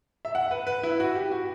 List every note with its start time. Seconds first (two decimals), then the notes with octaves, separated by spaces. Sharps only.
0.25 E5
0.35 F#5
0.51 B4
0.67 B4
0.83 E4
1.00 F#4
1.15 G4
1.31 F#4